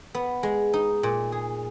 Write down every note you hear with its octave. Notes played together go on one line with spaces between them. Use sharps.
B3
G#3
D#4
A#2
G#4